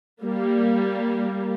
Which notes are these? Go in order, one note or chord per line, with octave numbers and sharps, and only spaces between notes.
G3 A#3